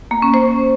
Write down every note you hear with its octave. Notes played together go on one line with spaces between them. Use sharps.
A#3
C#4
C5